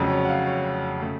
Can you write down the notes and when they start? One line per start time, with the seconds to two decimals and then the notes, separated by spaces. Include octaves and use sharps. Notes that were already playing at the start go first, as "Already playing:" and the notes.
Already playing: F1 F2 C#3 F#3
0.10 C#5
0.25 F#5
0.29 F5
0.46 C#5
1.02 C#3 A3